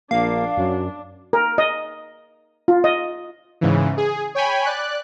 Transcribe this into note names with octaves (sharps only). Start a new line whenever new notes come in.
A#1 A#3 D4 F5
F#2 F#3
A#4
D#5
F4
D#5
G#2 C#3 E3
G#4
C#5 G5 G#5 B5
D5 F#6